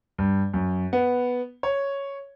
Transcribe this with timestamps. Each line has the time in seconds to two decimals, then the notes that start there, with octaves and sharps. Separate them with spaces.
0.18 G2
0.54 F#2
0.93 B3
1.63 C#5